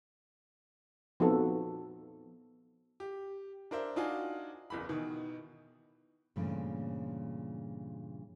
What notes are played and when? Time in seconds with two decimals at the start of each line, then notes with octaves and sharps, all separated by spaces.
1.20 F3 B3 C4 D#4 F#4 A4
3.00 G4
3.71 D4 A#4 C5 E5
3.96 D4 D#4 F4 F#4 F5 G#5
4.70 F#1 E2 B5
4.89 B2 D#3 E3
6.36 G2 A#2 C#3 E3 F3 A3